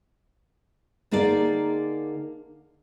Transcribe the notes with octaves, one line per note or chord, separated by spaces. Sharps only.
D3 A#3 D#4 G#4 D5